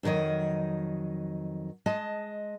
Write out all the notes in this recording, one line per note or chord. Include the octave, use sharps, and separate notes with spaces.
F2 B2 D#3 F#3 D#5
G#3 D#5 A5